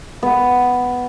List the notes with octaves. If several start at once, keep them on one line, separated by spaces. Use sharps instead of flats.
B3